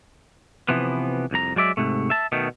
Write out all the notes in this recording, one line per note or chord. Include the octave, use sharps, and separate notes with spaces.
C3 E3 F3 B3
C2 F2 A#5
F#3 G#3 D5 E5
G#2 C3 A3
E5 A5
B2 D#3 A3